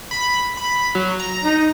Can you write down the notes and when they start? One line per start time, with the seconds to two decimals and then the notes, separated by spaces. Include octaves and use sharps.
0.11 B5
0.57 B5
0.95 F#3
1.20 A#5
1.44 D#4